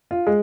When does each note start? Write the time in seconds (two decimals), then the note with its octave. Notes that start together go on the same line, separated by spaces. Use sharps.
0.11 F4
0.27 G#3